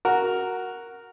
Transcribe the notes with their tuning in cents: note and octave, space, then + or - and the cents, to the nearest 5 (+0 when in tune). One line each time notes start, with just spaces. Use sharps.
F#4 +0 A#4 +0